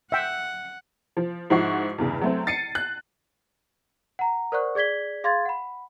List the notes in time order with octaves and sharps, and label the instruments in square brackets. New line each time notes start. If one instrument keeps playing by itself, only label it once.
[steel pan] E5 G5 [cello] F#5
[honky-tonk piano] F3
G#2 F3 E4 F#4 C#6 C7
E2 G2 C#3
F#3 A3 C4
A6 C7 C#7 D#7
F#6
[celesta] F#5 A#5
A#4 C5 D5 F#5 C#6 F#6
G#4 D5 G#6 B6 G7
G#4 F5 C6 G#6 A6
F#5 B5